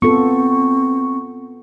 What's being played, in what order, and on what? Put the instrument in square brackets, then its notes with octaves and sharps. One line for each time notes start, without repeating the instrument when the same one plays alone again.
[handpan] B3 F4 A4 [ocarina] C4 [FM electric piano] C#6